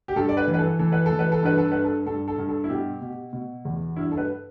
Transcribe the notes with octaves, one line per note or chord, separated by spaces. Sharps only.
G4
G2 A4
D5
B4
E3
B4
A4
E3 A4
B4
A4
E3
B4
A4
G2 B4
A4
G2 B4
A4
G2 A4
A4
G2
A4
E4
B2 G4
B2
B2
E2
G2 E4
A4
B4